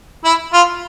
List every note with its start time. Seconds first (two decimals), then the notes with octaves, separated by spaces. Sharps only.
0.24 E4
0.53 F4